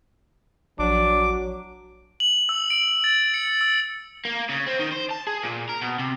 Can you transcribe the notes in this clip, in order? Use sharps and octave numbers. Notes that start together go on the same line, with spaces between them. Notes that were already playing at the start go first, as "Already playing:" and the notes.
A#1 F#3 D4 D6
F#7
E6
D7
A6
C#7
E6
A#3
C#3
C4
D#3
C5
A5
G#4
A#2
A#4
B2
C3